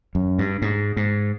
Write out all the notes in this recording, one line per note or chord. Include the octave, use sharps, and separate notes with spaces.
F#2
G2
G#2
G#2